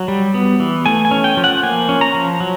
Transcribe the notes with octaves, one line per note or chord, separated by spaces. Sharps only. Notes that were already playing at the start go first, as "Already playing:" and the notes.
Already playing: F#3
G3
B3
E3
A3 G#5
G#5
C#4
G5
F3
F#5
A#3 G#5
C#4
A#5
F3
F#3